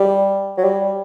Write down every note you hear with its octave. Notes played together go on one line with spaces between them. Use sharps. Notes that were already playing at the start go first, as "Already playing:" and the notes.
Already playing: G3
F#3
G3